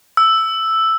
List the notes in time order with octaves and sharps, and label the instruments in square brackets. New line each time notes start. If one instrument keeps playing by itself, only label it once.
[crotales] E6